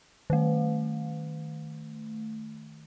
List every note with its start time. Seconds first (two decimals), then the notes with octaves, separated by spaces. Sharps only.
0.30 D#3 A3